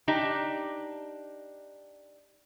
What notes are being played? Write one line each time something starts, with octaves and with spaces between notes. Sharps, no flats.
D4 D#4 G4